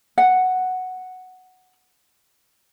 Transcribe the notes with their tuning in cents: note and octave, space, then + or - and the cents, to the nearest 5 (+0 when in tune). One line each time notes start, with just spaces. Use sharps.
F#5 +0